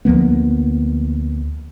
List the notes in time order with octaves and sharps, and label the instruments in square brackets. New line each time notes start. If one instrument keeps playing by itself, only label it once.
[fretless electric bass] D2 F3 A#3 B3